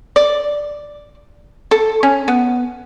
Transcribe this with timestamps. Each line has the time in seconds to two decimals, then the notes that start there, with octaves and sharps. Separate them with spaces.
0.16 D5
1.71 A4
2.03 C#4
2.28 B3